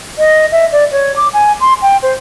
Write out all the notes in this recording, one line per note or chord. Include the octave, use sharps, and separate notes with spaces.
D#5
E5
D5
C#5
D6
G#5
C6
G5
C5